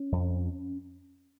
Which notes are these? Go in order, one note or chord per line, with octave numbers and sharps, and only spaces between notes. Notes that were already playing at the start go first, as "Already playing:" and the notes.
Already playing: C#4
F2